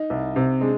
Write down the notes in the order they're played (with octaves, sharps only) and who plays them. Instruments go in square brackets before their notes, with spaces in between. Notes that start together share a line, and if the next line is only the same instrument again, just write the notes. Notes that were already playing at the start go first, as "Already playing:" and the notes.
Already playing: [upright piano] D#4
[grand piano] C2
C3
[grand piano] G#3 [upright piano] D4